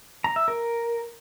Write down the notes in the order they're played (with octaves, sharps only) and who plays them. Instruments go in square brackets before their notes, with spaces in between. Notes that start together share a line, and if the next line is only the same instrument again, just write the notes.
[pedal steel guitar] A#5
E5
A#4